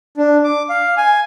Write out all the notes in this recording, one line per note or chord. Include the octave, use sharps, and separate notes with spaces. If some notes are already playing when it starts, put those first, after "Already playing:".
D4
D6
F5
G#5